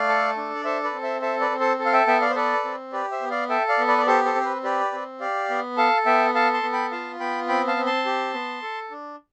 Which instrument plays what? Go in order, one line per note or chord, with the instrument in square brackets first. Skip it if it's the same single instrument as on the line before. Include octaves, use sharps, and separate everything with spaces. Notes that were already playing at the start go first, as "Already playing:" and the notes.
Already playing: [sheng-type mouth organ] A3 D5 F5
A4
D4
D5
A4 C5 E5
B4 D5
C4
C5 E5
A4 C5 E5
B4 D5
C4
A4 C5
A4
F5
E5 G5
B3 E5 G5
D5 F5
C5
A4 B4 D5
C4
G4 B4 D5
C5 E5
B3
D5 F5
A4 E5 G5
D5 F5
B3
B4 D5
D5
G4 A4 C5
A4 C5
C4
C5
B4
G4 B4 D5
C4
G4 D5 F5
B3
A4 F5 A5
B3 E5 G5
A4 F5 A5
A5 C6
B3
G5 B5
F4 F5 A5
B3 G5 B5
C4 G5 B5
F5 A5
C4
A5 C6
G4
B3
A4
D4